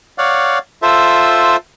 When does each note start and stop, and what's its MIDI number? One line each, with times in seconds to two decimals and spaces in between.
0.18 0.59 73
0.18 0.59 74
0.18 0.59 77
0.18 0.59 78
0.82 1.56 65
0.82 1.56 69
0.82 1.56 72
0.82 1.56 76